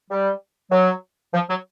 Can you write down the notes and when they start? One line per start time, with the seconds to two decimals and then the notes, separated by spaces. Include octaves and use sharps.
0.10 G3
0.71 F#3
1.33 F3
1.49 F#3